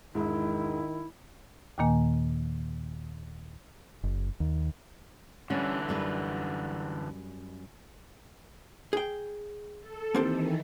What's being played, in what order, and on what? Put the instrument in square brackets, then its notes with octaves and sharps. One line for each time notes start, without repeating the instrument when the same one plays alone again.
[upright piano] E1 G#2 G#3 [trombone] D#3 [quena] E4
[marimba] D#2 A#2 D#3 A#3 G#5
[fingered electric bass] F#1
D#2
[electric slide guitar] D3 E3 [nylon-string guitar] G3 C#4
[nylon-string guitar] F#2 G3 B4
[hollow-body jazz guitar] G#4 G5
[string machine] A4
[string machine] D#3 E3 [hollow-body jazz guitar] A#3 C4 G4